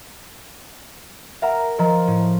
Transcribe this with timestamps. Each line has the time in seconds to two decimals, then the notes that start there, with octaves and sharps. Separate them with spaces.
1.42 A#4 E5 F#5 A#5
1.79 F3 A#4 D#5 A#5
2.07 A2